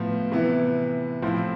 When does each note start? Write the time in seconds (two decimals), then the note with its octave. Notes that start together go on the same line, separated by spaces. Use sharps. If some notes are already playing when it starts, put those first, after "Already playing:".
Already playing: A2 F3 B3
0.32 C3 E3 B3 E4
1.22 A2 F3 C4 E4